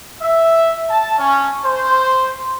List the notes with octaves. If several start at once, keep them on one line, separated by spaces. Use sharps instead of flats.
E5
A5
C#4
C5